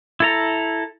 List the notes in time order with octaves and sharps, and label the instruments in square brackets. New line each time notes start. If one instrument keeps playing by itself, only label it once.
[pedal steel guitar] E4 A4 A#5